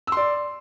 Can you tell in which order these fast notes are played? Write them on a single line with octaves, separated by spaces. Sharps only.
E6 C6 D5